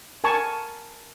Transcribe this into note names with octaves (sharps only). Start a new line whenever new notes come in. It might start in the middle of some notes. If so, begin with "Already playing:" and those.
A#4 G#5 A5 C#6